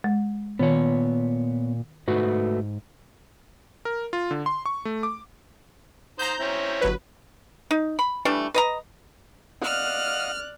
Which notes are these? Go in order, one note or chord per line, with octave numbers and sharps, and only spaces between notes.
G#3
A#2 D#3 B3 C#5
G#2 A3 F#4 B4
A#4
F4
D3
C6
C#6
A3
D6
D#4 C5 A#5 G6
C4 C#4 E4
G1 F#3 B4
D#4
B5
E3 G3 A3 D4
B4 D#5 A#5
D5 D#5 F5 F#5 F6 F#6